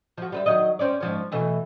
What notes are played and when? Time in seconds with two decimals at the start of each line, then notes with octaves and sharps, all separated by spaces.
0.17 F3 F#4
0.32 G3 B4 E5
0.46 D#3 F#3 D#5
0.79 C4 C#4 D5
1.00 G#2 F3 C#4
1.32 B2 E3 A3